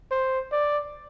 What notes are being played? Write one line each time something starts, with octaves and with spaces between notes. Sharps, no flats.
C5
D5